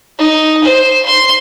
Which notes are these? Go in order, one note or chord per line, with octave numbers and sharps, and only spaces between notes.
D#4
C5
C6